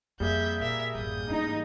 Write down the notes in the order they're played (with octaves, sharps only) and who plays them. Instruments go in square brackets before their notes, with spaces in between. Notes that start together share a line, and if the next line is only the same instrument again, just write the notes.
[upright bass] F2 [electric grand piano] G3 A#3 G#4 [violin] E5 G6
[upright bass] A#2 [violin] A#4 E5
[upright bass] A1 F#2 [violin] D#6 G6
[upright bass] G#2 E3 [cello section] D#4